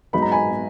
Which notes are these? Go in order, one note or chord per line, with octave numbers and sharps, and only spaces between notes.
G#2 F#3 B3 D#4 B5
A#5
G#5 B5